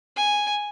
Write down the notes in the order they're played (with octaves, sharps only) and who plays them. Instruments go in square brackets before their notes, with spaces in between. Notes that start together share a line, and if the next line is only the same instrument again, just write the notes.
[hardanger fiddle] G#5